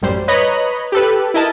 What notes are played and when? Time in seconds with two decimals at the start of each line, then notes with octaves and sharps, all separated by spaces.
0.02 A1 F#2 G3 C5
0.28 B4 C#5 D#5 A#5 B5
0.92 G4 A4 B4
1.34 E4 A#4 D#5 A5